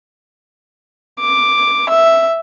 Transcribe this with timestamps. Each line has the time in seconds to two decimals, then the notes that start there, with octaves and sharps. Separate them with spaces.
1.20 D6
1.89 E5